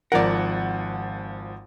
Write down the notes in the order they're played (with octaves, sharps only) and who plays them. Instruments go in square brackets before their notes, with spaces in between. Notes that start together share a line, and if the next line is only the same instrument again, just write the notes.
[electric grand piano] G#1 F3 F#5 [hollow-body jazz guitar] A#4 D5